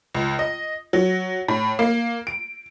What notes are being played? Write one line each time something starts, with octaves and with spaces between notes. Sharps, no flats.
C#2
D#5
F#3
A2
A#3
D7